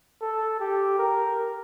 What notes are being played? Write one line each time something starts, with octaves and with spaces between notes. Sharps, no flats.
A4
G4
A#4